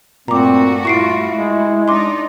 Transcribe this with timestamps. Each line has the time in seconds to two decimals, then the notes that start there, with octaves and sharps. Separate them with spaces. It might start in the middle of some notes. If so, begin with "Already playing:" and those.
0.28 G2 A#2 A3 C4 F#4 A#5 D6
0.85 E4 F4 C#6 C7 D7
1.30 G#3
1.88 D4 D#4 D5 C6 D6